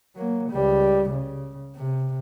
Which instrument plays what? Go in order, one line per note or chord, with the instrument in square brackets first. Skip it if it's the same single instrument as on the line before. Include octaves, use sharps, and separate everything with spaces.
[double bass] F#3 A#3
C#2 G3
C#3
C3